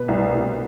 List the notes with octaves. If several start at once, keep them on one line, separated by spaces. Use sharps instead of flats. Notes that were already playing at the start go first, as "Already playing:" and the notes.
Already playing: B2 B4
C2
C2